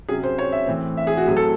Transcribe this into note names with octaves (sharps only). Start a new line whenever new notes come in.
C3 F#3 C#4 G#4
C5
C#5
E5
A2 E3 C4
E5
G#4
F#4
A2 F#3 C4 G#4
A4